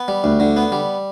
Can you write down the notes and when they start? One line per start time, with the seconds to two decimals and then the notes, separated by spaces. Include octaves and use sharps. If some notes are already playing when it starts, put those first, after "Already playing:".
Already playing: B3
0.08 G3
0.24 D2
0.40 D3
0.57 B3
0.72 G3